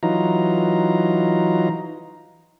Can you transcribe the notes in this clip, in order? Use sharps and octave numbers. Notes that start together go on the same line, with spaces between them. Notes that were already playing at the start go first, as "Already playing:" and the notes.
E3 F#3 D#4 F4 A#5